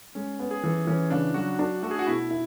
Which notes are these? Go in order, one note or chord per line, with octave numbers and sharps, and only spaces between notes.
G#3 C#4
B3
G#4
E3 A4
E3 C#4
C#3 D4
F#3 F#4
D4
A3 F#4
G#4
F#4
B2 E4
E4